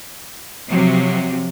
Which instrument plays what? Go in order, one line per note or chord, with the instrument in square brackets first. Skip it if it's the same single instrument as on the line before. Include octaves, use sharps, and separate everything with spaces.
[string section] C3 F3 F#3